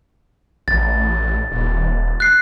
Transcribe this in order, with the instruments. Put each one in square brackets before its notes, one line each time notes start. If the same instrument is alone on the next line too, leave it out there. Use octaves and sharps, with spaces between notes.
[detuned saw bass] A1 [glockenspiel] A6
[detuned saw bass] D#1
[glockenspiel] F#6 C7